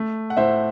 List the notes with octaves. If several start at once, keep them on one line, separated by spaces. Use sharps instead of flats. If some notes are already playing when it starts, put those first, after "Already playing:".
Already playing: A3
F#5
A2 C5 E5